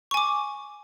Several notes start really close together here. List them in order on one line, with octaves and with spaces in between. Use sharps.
C#6 G#5 D6